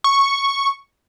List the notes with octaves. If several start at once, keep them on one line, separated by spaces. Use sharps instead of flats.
C#6